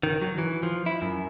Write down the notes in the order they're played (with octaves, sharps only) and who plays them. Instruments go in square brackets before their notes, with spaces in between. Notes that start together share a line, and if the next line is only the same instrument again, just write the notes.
[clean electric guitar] D#3
F#3
E3
F3
E4
F#2